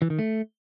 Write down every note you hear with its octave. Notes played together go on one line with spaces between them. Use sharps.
E3
D#3
A3